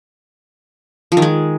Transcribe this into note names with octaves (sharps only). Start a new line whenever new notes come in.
F3
D#3
G#3